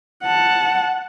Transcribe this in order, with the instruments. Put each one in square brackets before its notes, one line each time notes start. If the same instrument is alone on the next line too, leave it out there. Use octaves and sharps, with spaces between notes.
[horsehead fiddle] F#5 A5